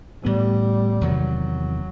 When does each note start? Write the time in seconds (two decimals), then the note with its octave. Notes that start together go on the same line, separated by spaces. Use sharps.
0.24 A2 E3 G3 B3
1.01 E2 C3 D#3 F#3